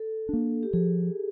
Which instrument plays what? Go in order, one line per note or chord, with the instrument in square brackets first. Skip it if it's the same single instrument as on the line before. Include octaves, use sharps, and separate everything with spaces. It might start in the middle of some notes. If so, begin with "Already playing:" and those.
Already playing: [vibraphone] A4
[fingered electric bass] A#3 D4
[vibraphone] G4
[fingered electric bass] F3 [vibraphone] G#4